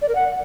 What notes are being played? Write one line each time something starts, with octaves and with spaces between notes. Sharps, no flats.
D5
A#4
F#5